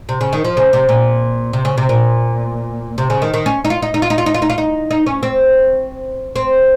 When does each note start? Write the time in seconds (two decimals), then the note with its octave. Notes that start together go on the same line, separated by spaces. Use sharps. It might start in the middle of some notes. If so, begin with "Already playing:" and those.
0.09 C3
0.21 C#3
0.33 D#3
0.45 F3
0.57 C#3
0.73 C3
0.89 A#2
1.53 C3
1.65 C#3
1.78 C3
1.89 A#2
2.98 C3
3.10 C#3
3.22 D#3
3.34 D#3
3.46 C#4
3.65 D#4
3.70 F4
3.82 D#4
3.94 D#4
4.02 F4
4.10 D#4
4.18 F4
4.26 D#4
4.34 F4
4.42 D#4
4.50 F4
4.58 D#4
4.91 D#4
5.07 C#4
5.23 C4
6.36 C4